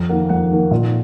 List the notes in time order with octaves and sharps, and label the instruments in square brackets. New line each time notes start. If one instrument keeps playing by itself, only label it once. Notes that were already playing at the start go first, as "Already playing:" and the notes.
Already playing: [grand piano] F2
D#3 A#3 F#5
F2 F#5
D#3 A#3
A#2